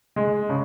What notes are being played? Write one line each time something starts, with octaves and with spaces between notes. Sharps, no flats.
G#3
C#3